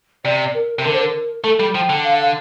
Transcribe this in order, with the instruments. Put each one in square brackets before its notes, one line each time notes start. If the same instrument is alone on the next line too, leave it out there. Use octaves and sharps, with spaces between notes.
[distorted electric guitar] C3 [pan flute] D5
[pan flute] A#4
[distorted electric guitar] C3
[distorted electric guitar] D3 [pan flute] A#4
[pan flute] C5
A#4
[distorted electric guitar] A3 [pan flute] A4
[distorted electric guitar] G3
[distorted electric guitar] F3 [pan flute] G5
[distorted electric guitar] D3
[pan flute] F5
F5